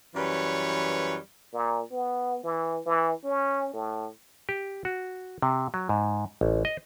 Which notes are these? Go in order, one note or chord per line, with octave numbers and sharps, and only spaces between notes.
F#2 E3 G3 B4 C#5
A#2
B3
E3
E3
C#4
A2
G4
F#4
C3
F#3
G#2
A1
D#5